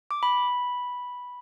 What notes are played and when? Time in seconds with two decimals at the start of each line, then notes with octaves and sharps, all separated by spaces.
0.11 D6
0.23 B5